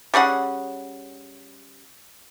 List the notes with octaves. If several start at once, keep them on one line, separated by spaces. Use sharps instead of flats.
G3 C#4 G#4 F#5